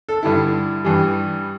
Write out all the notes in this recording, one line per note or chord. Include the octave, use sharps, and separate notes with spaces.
A4
G2 D3 G3 E4
G2 E3 G3